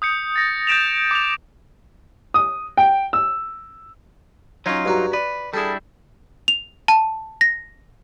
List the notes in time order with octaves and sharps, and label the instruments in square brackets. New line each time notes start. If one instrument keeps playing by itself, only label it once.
[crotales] D#6 G6 C#7
A6 A#6
G6 A#6 D7 E7 F7
D6 F7
[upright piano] D#6
G5
E6
[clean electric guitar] F#3 D#4 F4 [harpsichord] C#4 C#5
[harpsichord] G2 F#4 A#5
[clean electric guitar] B4 [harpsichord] D5
[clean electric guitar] G3 D4 E4 [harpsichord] G#4 A4
[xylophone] F7
A5
A#6